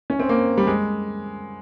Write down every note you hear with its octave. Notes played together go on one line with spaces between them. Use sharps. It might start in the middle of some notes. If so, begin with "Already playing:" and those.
C#4
C4
A#3
G3
G#3